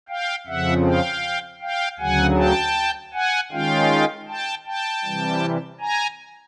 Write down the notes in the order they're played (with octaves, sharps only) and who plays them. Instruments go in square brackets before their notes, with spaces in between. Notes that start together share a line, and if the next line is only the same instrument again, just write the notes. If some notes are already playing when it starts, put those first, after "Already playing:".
[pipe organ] F5 G5
F2 C#3 F3 E5 F#5
F5 G5
F5 G5
D2 C#3 F#3 F#5 G#5
G5 A5
F#5 G#5
D#3 G#3 C#4 F4 F5 G5
G5 A5
G5 A5
C3 E3 G3
G#5 A#5